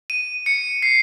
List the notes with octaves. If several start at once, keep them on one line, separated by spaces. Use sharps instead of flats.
D#7
C#7
C7